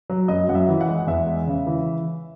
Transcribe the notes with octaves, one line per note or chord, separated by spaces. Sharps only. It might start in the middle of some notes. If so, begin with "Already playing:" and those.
F#3
F#2 D#5
F#2 F#5
E5
E3
F#5
G#3
E2 E5
G#3
C#3
E3